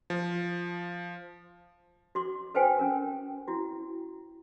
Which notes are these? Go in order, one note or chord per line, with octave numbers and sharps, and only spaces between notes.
F3
F#4 C6 D6
A4 B4 C5 F5 G5 G#5
C#4 A#4
E4 F#4